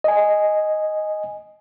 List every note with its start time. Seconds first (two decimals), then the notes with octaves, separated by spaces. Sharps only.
0.04 D#5 G#5